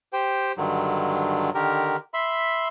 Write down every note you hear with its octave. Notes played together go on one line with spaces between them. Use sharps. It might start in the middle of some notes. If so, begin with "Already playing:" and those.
G4 C5 G5
G2 D3 D#3 F#3
D3 D#3 G4 A#4
E5 B5 C6